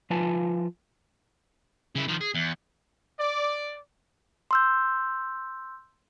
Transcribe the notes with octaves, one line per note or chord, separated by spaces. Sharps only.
F3 F4 B4 G#5 A5
C#3 E4
D#3 F3
G#4
E2
D5
C6 E6 G6